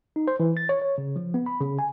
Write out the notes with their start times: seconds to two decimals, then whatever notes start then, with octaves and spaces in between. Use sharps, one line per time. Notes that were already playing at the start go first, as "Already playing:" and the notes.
0.16 D#4
0.28 C5
0.40 E3
0.57 A6
0.69 C#5
0.82 C#5
0.98 C#3
1.16 F3
1.34 B3
1.46 B5
1.61 C#3
1.79 G#5